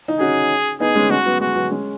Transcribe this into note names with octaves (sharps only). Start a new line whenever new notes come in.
D#4
C#4 F#4 G#4
B3 D#4 G#4
G#3 C#4
G#3 C#4 F#4
F#3 B3
G#3 F#4
F#3 B3
G#3 C#4